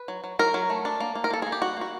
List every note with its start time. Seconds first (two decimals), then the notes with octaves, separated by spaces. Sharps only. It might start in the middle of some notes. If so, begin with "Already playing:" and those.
Already playing: B4
0.08 F#3
0.24 F#3
0.39 F#3 A#4
0.54 F#3
0.70 A3
0.85 D4
1.00 A#3
1.15 A#3
1.24 A#4
1.30 A#3 A4
1.42 A#3 G#4
1.52 G4
1.61 G3 F#4
1.77 A#3 F#4